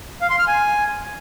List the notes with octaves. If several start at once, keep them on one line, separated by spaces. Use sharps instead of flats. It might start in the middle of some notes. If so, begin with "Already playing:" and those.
F5
C6
F6
G#5